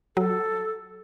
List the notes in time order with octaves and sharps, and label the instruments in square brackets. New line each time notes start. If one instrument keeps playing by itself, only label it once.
[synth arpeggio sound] F#3 [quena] A4